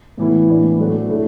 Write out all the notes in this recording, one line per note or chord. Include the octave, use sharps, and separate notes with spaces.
A2 E3 B3 E4
A2 E3 B3 D4
A2 F#3 A3 D4 F#4
A2 A3 E4